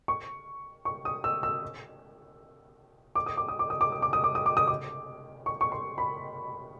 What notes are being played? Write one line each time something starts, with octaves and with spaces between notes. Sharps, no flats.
C#6
C#6
D#6
E6
E6
D6
D#6
D6
D#6
D6
D#6
D6
D#6
D6
D#6
D6
D#6
D6
D#6
D6
C#6
C#6
C6
B5